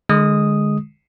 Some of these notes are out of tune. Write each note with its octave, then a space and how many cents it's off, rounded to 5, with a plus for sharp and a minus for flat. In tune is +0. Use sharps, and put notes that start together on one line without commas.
D3 +35 G#3 +0 D#6 +0